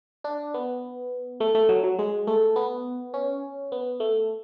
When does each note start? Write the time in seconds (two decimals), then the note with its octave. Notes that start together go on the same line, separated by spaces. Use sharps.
0.24 D4
0.54 B3
1.40 A3
1.55 A3
1.69 F#3
1.83 F#3
1.99 G#3
2.27 A3
2.56 B3
3.14 C#4
3.72 B3
4.00 A3